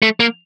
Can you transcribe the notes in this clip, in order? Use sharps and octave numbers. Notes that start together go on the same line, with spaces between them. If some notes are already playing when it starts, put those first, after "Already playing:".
A3
A#3